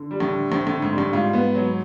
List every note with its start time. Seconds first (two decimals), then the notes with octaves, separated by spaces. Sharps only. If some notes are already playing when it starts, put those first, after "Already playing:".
Already playing: D3
0.11 G3
0.20 A2
0.31 D3
0.52 A2 C4
0.67 A2
0.72 D3
0.82 G#2
0.93 G3
0.98 A2
1.13 G#2 F4
1.33 B3
1.55 F#3